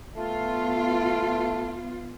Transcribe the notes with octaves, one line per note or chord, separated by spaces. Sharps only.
A3 B3 F4